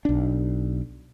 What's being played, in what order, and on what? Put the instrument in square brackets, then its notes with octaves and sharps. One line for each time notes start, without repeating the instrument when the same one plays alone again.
[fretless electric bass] B1 D4